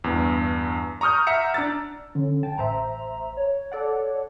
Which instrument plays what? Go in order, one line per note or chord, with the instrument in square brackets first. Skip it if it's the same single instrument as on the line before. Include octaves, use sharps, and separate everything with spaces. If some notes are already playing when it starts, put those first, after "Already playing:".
[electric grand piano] E2 G2
A#5 C#6 D#6 F6 G6
E5 F#5 A#5 E6 C#7
D4 A#5 E6 A6
[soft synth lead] D3 [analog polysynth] C#4
[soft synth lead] G5 [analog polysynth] A5
[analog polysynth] A1 C5 E5 [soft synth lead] A#5
[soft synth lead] C#5
[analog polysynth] A4 D5 F#5